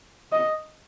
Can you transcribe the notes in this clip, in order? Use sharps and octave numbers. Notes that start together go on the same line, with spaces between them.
D#5